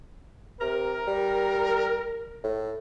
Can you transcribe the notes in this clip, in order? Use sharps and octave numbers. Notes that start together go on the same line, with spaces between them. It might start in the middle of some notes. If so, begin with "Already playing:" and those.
C3 A#4
G3
A2